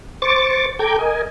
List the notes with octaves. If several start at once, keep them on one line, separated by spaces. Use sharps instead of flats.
C5 C#6 D6 A6
A4 G5 A#5 D6 G6 G#6
A#4 D#5 G#5